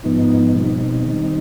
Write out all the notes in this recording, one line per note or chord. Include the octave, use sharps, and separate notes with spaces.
G#2 F3 B3 D#4
B2 G3 C4 D#4
D#3 G3 C4 D#4